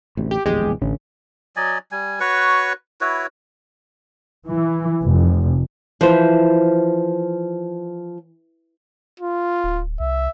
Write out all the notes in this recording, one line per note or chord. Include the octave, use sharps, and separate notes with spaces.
A1 D2 C3
G4
D1 A#1 E2 G#3 G4
A1 D3 C#4
F#3 D5 D#5 G#5
G3 G#5
F#4 B4 C#5 C#6
E4 F#4 B4 C#5
E3
F1
E3 F3 B4 C5
F4
D1
C2 E5